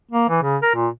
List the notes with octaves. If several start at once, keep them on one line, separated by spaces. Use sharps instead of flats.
A#3
E3
C#3
A#4
A#2